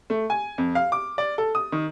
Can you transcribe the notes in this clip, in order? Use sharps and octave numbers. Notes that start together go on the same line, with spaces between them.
A3
G#5
F2
F5
D6
D5
A4
D#6
D#3